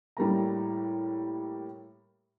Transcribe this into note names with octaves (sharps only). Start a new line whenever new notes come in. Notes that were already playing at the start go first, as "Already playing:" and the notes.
A2 G3 A#3 A#5